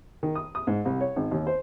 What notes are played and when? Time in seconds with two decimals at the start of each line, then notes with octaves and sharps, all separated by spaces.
0.23 D#3
0.35 D#6
0.55 D#6
0.67 G#2
0.85 C2
1.01 C#5
1.16 G#1
1.31 D#2
1.47 C5